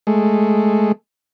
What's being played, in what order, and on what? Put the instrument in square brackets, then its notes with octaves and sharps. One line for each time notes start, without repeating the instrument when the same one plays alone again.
[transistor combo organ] G#3 A3